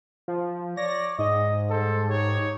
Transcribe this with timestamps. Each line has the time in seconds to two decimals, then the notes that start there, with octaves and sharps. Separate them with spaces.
0.28 F3
0.77 C#5 D5 A#6
1.19 G#2 D#5
1.70 G3 A4 C5
2.08 D#4 G4 C#5